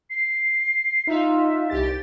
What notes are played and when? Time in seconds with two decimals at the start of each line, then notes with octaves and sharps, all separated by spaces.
0.10 C7
1.07 D#4 F4 E5
1.70 C2 G4 A6